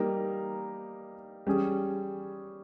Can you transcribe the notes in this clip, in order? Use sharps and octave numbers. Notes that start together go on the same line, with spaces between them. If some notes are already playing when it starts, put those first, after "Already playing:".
Already playing: G3 A#3 D#4 A#4
G3 C#4 G#4